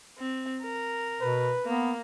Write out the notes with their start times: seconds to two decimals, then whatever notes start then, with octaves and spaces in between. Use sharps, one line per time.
0.18 C4
0.62 A#4
1.21 B2 B4
1.65 A#3 B3